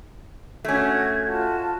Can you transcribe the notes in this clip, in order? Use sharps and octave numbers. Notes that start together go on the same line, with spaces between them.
A3 C#4 F#4 G#6
F4 F#4 A5